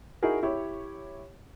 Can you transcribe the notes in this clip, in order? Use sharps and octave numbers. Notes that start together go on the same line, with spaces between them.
D#4 E4 F#4 G#4 A#4
E4 G4 C#5